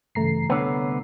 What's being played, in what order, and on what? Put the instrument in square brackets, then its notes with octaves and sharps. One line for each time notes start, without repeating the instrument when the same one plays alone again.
[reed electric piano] G2 C#3 E3 [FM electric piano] A3 A#5 C7
[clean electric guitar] C2 D3 B3 [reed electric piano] C#5